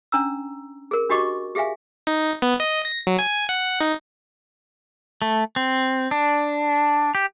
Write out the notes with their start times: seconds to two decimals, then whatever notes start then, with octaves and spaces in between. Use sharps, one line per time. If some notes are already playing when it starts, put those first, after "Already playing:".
0.12 C#4 D4 A#5 E6
0.91 G#4 A#4
1.09 D4 F#4 G4 D#5 C#6 D6
1.55 G4 G#4 E5 F5 G#5
2.07 D#4
2.42 B3
2.60 D#5
2.85 A#6
3.07 F#3
3.19 G#5
3.49 F#5
3.81 D#4
5.22 A3
5.56 C4
6.11 D4
7.15 G4